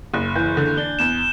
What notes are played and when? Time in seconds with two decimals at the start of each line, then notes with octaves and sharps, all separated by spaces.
0.14 F#1 F#6
0.35 E3 G6
0.57 D3
0.77 D4 G7
0.99 E2 E7